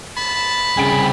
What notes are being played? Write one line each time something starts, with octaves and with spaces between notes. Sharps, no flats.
A5 B5
C2 C#3 G5 G#5 D7